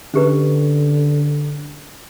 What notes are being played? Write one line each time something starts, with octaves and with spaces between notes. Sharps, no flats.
D3 C#4 G4 B4